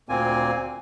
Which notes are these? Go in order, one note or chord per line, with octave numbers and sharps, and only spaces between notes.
D2 A#2 A#3 C4 G#5